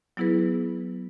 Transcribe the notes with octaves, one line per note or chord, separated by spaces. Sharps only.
F#3 B3 E4 G#4 B4